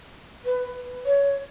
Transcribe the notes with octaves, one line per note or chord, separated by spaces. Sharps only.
B4
C#5